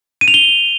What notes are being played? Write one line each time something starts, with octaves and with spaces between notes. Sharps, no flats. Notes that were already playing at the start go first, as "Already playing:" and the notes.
D#7
F7
G7